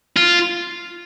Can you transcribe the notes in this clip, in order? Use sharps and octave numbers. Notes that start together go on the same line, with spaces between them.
F4